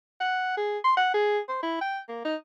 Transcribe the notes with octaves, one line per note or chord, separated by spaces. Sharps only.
F#5
G#4
C6
F#5
G#4
C5
E4
G5
A#3
D#4